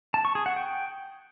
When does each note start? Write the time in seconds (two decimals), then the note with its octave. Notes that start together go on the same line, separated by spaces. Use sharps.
0.14 A5
0.25 C#6
0.35 G#4
0.46 F#5
0.56 G5